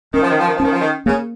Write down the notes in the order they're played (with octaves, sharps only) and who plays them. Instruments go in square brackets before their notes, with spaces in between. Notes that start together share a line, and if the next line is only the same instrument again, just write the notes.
[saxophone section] D#3 [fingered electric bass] C#4
[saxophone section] F3
D#3
F3
D#3
F3
[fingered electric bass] C#4
[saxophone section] D#3
F3
D#3
[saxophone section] C#3 [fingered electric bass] A#3